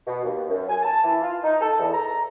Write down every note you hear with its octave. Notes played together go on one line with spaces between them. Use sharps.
B2
D#2
F#2
G#5
A5
E3
F4
D#4
A4
E2
A#5